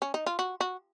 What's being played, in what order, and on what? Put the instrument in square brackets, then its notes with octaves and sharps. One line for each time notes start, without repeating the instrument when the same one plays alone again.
[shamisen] C#4
D#4
F4
F#4
F#4